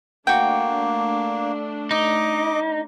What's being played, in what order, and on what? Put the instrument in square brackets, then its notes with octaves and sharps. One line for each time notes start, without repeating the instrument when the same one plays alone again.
[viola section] A3 D4 [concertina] A#3 [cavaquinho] F#4 G5
[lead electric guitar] D#4 [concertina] D#5 D6